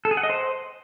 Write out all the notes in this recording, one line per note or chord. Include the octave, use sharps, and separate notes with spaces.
A4
G#4
F#5
D#5
C5